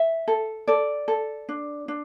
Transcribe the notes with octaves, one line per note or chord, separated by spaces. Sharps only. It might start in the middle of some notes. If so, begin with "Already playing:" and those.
Already playing: E5
A4
A4 D5
A4
D4
D4